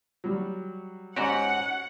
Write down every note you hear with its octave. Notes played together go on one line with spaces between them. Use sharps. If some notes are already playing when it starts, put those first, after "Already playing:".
F#3 G3
G#2 C#4 F#4 G4 F#5